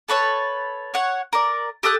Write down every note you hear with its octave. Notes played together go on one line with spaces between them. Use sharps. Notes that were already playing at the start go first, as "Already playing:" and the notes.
A4 B4 C#5 A5
C#5 F#5
A#4 D5
G4 A4 D#6 F#6